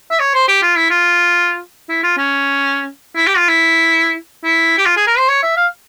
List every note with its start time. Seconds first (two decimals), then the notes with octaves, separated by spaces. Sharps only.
0.11 E5
0.20 C#5
0.34 C5
0.48 G4
0.63 F4
0.76 E4
0.91 F4
1.89 E4
2.04 F4
2.18 C#4
3.16 E4
3.27 G4
3.38 F4
3.48 E4
4.44 E4
4.78 G4
4.86 F4
4.97 G#4
5.07 A#4
5.18 C5
5.28 C#5
5.43 E5
5.57 F5